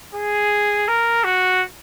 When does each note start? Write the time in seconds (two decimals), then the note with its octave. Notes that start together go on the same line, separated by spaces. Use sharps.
0.15 G#4
0.88 A#4
1.24 F#4